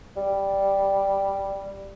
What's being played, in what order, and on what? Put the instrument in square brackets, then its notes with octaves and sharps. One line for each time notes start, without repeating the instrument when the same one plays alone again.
[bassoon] G3